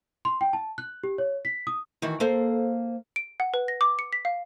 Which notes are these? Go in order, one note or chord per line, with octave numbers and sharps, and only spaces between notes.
C6
G5
A5
F#6
G4
C#5
B6
D#6
D#3 E3 F#4
A#3 A4 C5
D7
F#5
B4
A#6
D6
C#7
B6
F5